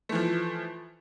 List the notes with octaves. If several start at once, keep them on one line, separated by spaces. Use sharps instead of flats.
E3 F3 A3